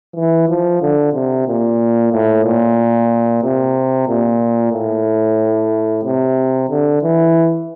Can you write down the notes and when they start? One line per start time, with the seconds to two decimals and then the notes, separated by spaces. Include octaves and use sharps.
0.15 E3
0.49 F3
0.82 D3
1.13 C3
1.47 A#2
2.12 A2
2.45 A#2
3.43 C3
4.08 A#2
4.73 A2
6.04 C3
6.70 D3
7.02 E3